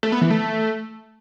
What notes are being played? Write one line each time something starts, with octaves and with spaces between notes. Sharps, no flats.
A3
B3
E3
A3